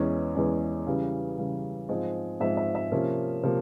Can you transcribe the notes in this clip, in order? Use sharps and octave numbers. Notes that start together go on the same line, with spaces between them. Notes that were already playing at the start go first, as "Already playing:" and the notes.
Already playing: E2 E3 G#3 C#4
E2 E3 G#3 C#4
C#3 E3 G3
C#3 E3 G3
G#2 F3 G#3 C4
G#2 F3 G#3 C4 E5
E5
E5
C3 F3 A#3 C#4
C3 F3 A#3